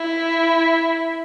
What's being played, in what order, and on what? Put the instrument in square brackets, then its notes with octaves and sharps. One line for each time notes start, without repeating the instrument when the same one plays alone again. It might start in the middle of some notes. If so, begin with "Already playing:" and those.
Already playing: [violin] E4